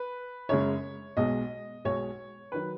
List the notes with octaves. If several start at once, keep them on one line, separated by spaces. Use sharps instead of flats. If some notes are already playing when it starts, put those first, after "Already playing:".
Already playing: B4
F#2 C#3 G#3 C#5
B1 B2 G#3 D#5
B1 B2 G#3 C#5
D#3 F#3 B4